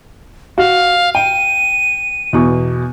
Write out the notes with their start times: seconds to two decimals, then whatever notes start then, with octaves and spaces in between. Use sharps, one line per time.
0.58 F#4 F5
1.15 G5 D#7
2.33 E2 B2 C#6